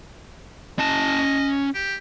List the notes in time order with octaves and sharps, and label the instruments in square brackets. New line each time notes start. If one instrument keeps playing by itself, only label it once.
[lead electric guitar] C#4 A5 [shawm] D#5
[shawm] G4